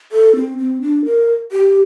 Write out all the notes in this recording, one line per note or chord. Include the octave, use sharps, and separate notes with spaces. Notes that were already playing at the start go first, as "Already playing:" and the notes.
A4
C4
C4
D4
A#4
G4